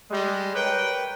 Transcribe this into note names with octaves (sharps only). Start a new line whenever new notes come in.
G3 G#3
A#4 B4 C#5 G5